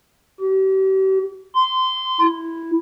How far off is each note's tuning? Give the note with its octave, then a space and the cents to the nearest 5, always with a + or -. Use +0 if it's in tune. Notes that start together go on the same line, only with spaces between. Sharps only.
G4 -40
C6 -20
E4 +0